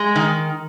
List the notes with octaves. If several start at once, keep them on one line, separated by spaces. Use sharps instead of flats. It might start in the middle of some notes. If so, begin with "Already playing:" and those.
Already playing: G#3
D#3